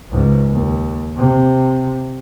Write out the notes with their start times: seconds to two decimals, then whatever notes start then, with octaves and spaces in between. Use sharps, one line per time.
0.12 C#2 G#2
0.49 D#2
1.17 C3